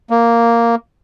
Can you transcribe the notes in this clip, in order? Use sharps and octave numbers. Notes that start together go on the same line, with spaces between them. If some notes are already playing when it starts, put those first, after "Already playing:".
A#3